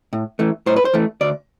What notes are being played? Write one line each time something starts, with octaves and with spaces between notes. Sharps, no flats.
A2
E3 A3
A2 C5
B4
C5
E3 A3
D2 D5